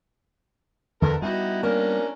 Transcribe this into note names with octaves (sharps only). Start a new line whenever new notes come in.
E2 D3 B3 A4 A#4
G3 B3 D#4 E4 F#4
A#3 C#4 D4 A#5